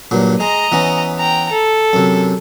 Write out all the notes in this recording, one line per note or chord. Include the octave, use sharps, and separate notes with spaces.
G2 A#2 F#3
G#3 D#5 A#5
E3 B3 C#4
G5 A#5
A4
F#2 C3